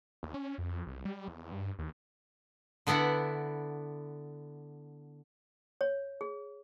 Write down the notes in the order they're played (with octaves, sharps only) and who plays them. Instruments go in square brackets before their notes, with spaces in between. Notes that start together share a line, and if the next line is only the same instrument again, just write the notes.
[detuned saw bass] D#2
C#4
F2
C2
G3
E2
G2
D#2
[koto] D3 B3 D4 E4 F#5
[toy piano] C#5
G#4